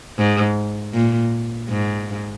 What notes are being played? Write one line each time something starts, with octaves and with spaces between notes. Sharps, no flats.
G#2
A#2
G#2